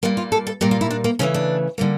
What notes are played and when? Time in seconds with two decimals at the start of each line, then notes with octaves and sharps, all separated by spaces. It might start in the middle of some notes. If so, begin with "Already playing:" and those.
0.03 A#2 G3 A#3 F4
0.17 F4
0.32 A4
0.47 A4
0.61 A#2 G3 A#3 G4
0.71 F4
0.81 E4
0.90 D4
1.04 A#3
1.19 C#3 E3 A3 C#4
1.34 D4
1.78 D3 G3 A#3